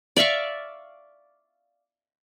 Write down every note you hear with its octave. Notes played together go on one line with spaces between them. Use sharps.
D5 E5 F5 C#6